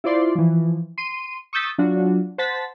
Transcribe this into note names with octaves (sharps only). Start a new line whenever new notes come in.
E4 F4 C5 D5 C6
E3 F3
C6 D#7
C#6 D#6 E6 G6 A6 B6
F#3 D4 F4 F#4
C5 F#5 A5 A6 B6